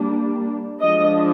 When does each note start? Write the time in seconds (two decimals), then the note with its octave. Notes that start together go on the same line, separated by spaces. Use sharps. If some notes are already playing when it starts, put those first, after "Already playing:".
Already playing: G3 A#3 D4
0.82 F3 G#3 D4 D#5